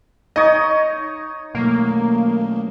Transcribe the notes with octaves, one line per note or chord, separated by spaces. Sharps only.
D#4 C#5 D#5
B2 F#3 A3 A#3